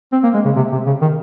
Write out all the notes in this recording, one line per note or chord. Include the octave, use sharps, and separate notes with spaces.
C4
A#3
G#3
C#3
C3
C3
C#3
D#3